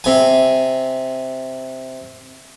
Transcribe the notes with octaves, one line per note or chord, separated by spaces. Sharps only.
C3 G#5